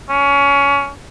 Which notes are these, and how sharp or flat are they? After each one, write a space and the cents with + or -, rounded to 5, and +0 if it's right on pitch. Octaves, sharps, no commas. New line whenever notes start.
C#4 +25